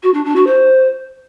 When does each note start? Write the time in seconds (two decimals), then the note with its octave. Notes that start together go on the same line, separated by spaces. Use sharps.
0.03 F#4
0.14 D4
0.25 D4
0.36 F#4
0.47 C5